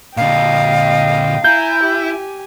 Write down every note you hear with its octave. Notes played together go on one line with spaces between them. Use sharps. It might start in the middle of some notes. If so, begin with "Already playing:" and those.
A#2 D3 D#5 F5 G5
E4 G#5 A#5 G6
G4 G#5